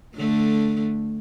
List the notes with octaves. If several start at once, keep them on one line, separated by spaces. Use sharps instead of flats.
D3 A3